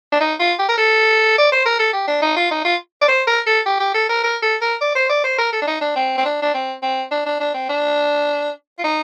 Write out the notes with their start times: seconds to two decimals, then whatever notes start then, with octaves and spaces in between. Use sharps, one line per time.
0.12 D4
0.20 D#4
0.39 F4
0.59 G4
0.69 A#4
0.78 A4
1.38 D5
1.52 C5
1.65 A#4
1.79 A4
1.93 G4
2.07 D4
2.22 D#4
2.36 F4
2.51 D#4
2.65 F4
3.01 D5
3.08 C5
3.27 A#4
3.47 A4
3.66 G4
3.80 G4
3.94 A4
4.09 A#4
4.23 A#4
4.42 A4
4.61 A#4
4.81 D5
4.95 C5
5.09 D5
5.24 C5
5.38 A#4
5.53 A4
5.62 D4
5.67 D#4
5.81 D4
5.96 C4
6.18 C4
6.25 D4
6.42 D4
6.54 C4
6.82 C4
7.11 D4
7.26 D4
7.40 D4
7.54 C4
7.69 D4
8.78 F4
8.84 D#4